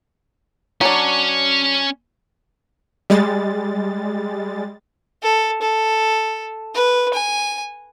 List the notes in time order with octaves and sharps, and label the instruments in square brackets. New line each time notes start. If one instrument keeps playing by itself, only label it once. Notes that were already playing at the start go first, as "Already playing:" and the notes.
[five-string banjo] F#3 D4 [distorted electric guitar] C#4 C#5
[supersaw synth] G3 G#3 A6
[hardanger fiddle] A4
A4
B4
G#5